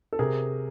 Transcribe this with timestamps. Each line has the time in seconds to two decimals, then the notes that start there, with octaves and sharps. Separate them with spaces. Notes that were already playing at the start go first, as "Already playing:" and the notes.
0.13 A4
0.19 C3 G#4 A#4